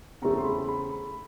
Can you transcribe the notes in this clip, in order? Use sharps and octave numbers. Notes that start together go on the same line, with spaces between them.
E2 C#3 E3 A3 C4 A#5
C6
B5
B5